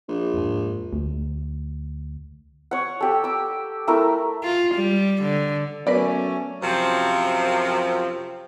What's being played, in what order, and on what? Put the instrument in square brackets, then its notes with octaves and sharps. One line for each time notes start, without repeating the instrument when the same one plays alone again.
[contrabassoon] A#1
[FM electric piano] E2 G#2
[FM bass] D2
[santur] C#5 F#5
G4 A4
D6 E6
A3 E4 A#4
[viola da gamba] F4
G3
D3
[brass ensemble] F#3 A3 C#4 [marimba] B3 A#4 B4 [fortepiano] D5
[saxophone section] F#2 C3 F3